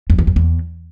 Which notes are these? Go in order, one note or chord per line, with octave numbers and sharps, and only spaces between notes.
F2
E2
F2
E2